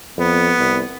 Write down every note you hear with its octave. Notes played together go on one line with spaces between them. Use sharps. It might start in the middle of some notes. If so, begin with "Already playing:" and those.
F2 B3
C2